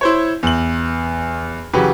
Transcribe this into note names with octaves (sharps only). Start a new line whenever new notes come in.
E4 C5 C#5
E2 F#7
C#3 E3 F#3 F#4 G4 B4